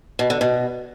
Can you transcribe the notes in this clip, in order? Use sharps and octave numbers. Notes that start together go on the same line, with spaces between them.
B2
D3
B2